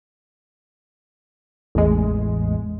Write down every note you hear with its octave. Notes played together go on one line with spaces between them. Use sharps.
A1 E2 G#3